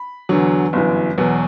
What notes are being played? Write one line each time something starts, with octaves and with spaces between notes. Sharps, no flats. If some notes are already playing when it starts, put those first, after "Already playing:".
Already playing: B5
E2 D3 F#3
G1 F#2 E3
E2 B2 F#3